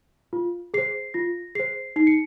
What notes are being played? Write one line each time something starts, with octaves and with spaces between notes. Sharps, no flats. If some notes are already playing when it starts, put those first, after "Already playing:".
F4
G#4 C5 C7
F4 A#6
G#4 C5 C7
D#4 C7
C#7